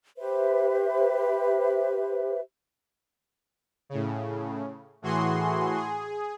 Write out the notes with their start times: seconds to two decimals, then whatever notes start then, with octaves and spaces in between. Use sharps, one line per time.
0.17 G4 B4 C5 E5
3.89 A2 C#3
5.02 A2 E3 F#4 G#4 C6
5.77 G#4